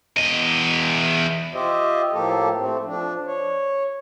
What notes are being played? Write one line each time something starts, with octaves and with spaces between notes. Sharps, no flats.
E2 D#5
F4 G4 C5 D#5 E5
A2 F3 A#3 G4 A4
A3 C4
F3 D4
C#5